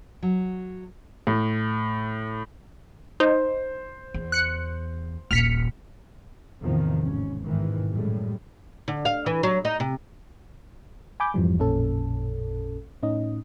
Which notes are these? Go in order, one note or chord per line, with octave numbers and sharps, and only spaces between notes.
F#3
A2
D#4 C5
E2
F#6 C#7
D#1 A#1 F6 B6 C#7
E2 A2 C3 D#3 F3
G#1 C#4
A1 G#2 B2 D#3 E3
F#2 A2 G3 G#3
D3
F5
E3
F#3
D#4
C3
G#5 B5 D6 G6
F2 G#2 E3 F3 G3
A1 F2 A#2 C#4 A4
A2 C#4 D#4 D#5